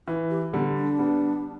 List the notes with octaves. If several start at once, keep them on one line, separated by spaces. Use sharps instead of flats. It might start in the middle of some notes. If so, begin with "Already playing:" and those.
E3 E4
G4
D3 G3 B3
D4
G3 B3